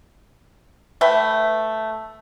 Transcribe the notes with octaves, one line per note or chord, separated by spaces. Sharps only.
A3 B4 E5 G5